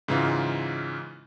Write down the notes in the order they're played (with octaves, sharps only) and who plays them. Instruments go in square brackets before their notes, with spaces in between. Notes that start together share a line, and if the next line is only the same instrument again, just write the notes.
[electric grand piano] G#2 C#3 E3 D#4 F4